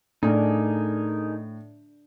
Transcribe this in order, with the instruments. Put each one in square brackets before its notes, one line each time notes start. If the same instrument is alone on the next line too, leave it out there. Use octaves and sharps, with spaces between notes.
[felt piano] A2 [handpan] D4 [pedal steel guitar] D#4 G#4 A#4